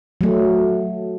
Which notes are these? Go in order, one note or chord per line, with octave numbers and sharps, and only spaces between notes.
F#3 A3